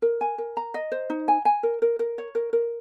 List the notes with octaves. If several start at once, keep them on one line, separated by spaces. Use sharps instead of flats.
A#4
G#5
A#4
A#5
D#5
C5
D#4
G#5
G#5
A#4
A#4
A#4
C#5
A#4
A#4